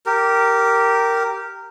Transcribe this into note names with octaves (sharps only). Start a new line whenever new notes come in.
G4 A#4